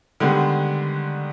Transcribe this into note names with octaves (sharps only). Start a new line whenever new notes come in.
D3 D#3 G3 G#3 B3